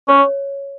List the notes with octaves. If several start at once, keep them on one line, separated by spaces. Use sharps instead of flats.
C#4 C#5